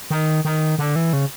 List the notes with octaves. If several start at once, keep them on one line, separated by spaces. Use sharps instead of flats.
D#3
D#3
D3
E3
C#3